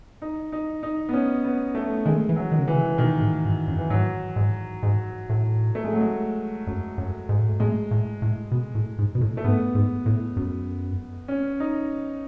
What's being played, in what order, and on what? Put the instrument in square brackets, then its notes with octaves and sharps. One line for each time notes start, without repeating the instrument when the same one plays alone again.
[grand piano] D#4
D#4
D#4
B3
C#4
B3
A3
[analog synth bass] D#3 [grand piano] G#3
[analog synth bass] E3
[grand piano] F#3
[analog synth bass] D#3
C#3
[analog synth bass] D#3 [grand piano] E3
[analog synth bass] C#3
[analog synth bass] B2 [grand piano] D#3
[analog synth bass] A2
G#2
F#2
[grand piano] E3
[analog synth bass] G#2 [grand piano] F#3
[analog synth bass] G#2
G#2
A2
[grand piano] A3
G#3
F#3
G#3
[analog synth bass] F#2
F#2
G#2
A2
G#2
[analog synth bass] A2 [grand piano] G#3
[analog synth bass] A2
A2
B2
A2
G#2
B2
A2
[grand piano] A3
[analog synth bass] G#2 [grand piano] B3
[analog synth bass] G#2
A2
F#2
[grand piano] C#4
D#4